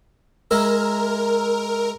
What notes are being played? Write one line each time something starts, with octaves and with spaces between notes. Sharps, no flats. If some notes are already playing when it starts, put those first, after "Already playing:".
G#3 E4 A#4 E5